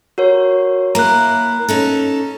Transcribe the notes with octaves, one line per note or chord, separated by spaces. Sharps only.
F#4 A#4 C#5
A#3 E4 A#5 F#6
C#4 D#4 A4